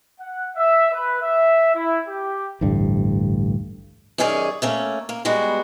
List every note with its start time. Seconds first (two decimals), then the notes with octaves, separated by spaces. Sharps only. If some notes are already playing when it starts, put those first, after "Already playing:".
0.20 F#5
0.57 E5
0.92 B4
1.22 E5
1.75 E4
2.09 G4
2.61 A1 D2 G2
4.18 F#2 D#3 C#4 G#4 A#4 D5
4.62 A3 A#3 C#4
5.09 A#3
5.25 G3 G#3 B3 F#4